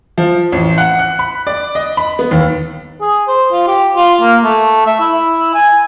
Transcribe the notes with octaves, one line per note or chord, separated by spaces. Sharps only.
F3
A1
F#5
F#6
B5
D5
D#5
B5
B3
D#2
G#4
C5
F4
G4
F4
A#3
A3
E5
E4
G#5